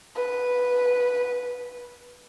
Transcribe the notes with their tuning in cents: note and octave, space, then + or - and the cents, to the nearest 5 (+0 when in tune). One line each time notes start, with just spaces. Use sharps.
B4 -5